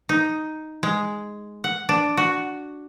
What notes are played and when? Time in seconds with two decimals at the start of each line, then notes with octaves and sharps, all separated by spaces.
0.09 D#4
0.83 G#3
1.64 F#5
1.89 D4
2.17 F#4